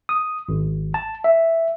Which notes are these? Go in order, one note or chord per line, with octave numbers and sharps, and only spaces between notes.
D#6
G#1
A5
E5